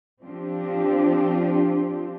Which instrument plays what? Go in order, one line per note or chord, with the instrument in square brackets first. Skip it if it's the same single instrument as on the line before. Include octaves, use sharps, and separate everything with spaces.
[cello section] F3 C4 D4 F4 G4